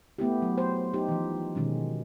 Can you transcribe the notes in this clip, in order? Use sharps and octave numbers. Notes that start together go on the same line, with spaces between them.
A3 B3 E4 G4
F#3
C5
D#4 G4
E3 F3
B2 D#3 G#3 C#4